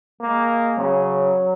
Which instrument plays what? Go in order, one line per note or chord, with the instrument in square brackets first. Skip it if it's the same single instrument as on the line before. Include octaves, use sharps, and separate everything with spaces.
[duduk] G#3 [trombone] A#3
[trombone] C#3 [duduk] F#3